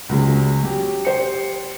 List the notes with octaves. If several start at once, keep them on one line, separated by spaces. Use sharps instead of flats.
C#2 F#3 G#3
F#3 G4
G4 C5 C#7